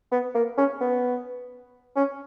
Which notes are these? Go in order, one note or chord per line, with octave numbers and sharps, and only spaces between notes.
B3
A#3
C#4
B3
C#4